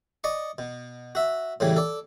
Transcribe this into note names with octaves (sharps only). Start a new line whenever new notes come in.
D5 D#5 C#6
B2
F#4 E5
A2 C#3 E3 G3
A4 D5